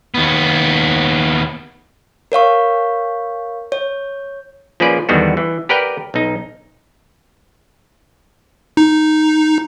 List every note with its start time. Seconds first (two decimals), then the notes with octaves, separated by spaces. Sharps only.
0.14 D#2 B3
2.32 A#4 C#5 F5 C#6
3.72 C#5
4.80 F3 A#3 C#4 G#4 B4 D5
5.09 E2 D3 D#3 G3 B3 F#4
5.37 E3
5.69 G4 A#4 B4 D5 F#5 G5
6.14 B1 D#4
8.77 D#4